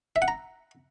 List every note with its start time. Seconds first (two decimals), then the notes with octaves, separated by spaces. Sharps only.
0.16 E5
0.22 F#5
0.28 A#5